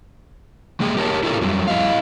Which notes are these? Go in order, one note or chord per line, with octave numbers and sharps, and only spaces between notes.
G#3 A#3 G#4 G5
G4 A#4 C#5 A5
E4 F4 G4 A4 A#4
F2 F#3 G3
E4 D#5 F5